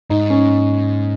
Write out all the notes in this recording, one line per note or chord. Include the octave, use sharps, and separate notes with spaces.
G#2 D#4
C#4